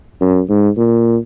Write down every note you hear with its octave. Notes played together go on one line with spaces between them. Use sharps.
F#2
G#2
A#2